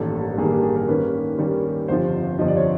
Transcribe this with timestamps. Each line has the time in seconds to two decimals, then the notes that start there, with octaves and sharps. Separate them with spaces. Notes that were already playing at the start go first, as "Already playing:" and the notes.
Already playing: A1 G2 D#3 G3 A#3 A4
0.38 A1 G2 D#3 G3 A#3 G#4
0.51 G4
0.63 G#4
0.76 A#4
0.88 D#2 D#3 G3 A#3 C#4 B4
1.38 D#2 D#3 G3 A#3 C#4
1.88 G1 F2 C3 F3 C5
2.39 G1 F2 C3 F3 D#5
2.48 D5
2.57 C#5